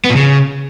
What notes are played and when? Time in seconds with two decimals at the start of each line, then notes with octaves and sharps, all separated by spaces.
0.04 B3
0.10 A#2
0.16 C#3